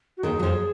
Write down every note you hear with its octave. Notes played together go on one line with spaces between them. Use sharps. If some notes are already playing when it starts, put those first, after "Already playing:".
F#4
D#2 D#3 G#4
F#3
F2 F3